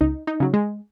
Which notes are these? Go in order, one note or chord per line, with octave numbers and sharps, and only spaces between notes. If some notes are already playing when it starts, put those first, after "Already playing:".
C#2 D#4
D#4
C#3 F#3
G#3